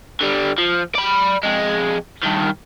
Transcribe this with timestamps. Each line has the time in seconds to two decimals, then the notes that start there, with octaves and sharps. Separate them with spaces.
0.21 D3 G3
0.58 F3
0.95 D5 B5
1.43 F2 G#3
2.23 G2 D#3